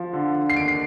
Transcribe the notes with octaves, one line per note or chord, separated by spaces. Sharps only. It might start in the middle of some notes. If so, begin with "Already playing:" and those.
Already playing: F3
D3
D3
C7
D#2 D7
C7